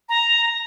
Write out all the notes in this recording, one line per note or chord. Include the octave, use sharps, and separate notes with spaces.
A#5